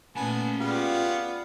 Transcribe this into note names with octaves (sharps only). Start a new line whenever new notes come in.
A#2 A3 B3 C#4 G#5 A5
B3 F4 G4 G#4 D5 F5